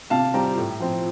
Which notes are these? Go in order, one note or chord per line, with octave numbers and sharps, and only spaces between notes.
C3 F5 A5
G3 C4 G5 A#5
A2
F3 C4